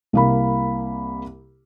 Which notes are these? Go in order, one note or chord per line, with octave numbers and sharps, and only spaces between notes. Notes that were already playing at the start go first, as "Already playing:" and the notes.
C2 A#3 B5